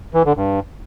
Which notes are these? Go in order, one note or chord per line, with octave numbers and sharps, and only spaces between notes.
E3
D3
G2